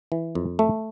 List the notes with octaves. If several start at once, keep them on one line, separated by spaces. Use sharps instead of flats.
E3
F2
A3